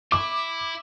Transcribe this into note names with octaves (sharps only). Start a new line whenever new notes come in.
E4 D6